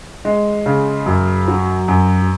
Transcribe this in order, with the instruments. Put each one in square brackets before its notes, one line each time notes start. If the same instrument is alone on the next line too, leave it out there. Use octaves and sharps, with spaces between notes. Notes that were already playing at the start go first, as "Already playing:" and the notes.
[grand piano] G#3
C#3
F#2
F#3
F#2